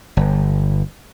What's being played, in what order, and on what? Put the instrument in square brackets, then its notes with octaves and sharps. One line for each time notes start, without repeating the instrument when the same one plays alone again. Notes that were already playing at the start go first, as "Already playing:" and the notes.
[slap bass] G1